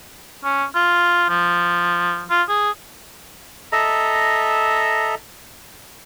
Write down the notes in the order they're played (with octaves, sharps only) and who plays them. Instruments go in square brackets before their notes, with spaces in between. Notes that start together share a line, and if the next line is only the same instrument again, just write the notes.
[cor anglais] C#4
F4
F3
F4
G#4
[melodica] A4 D#5 E5 A#5